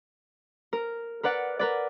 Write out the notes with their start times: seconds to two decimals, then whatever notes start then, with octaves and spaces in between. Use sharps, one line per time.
0.73 A#4
1.23 A#4 B4 D5 F#5
1.59 A#4 B4 D5